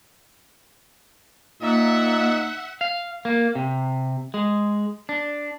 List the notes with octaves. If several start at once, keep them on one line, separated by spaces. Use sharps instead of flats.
A#2 A#3 D#4 E5 F#5
F5
A#3
C3
G#3
D4